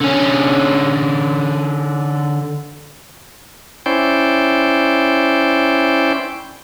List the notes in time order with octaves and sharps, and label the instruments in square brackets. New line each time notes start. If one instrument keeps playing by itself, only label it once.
[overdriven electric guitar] D3 C#4
[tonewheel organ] C#4 E4 C5 D5 G5